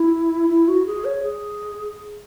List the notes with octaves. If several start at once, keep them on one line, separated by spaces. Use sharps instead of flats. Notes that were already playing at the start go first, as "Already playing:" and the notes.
Already playing: E4
E4
F#4
G#4
C#5
G#4